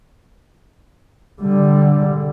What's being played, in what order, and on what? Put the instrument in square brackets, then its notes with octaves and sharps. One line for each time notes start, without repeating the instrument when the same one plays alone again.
[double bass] D3 G3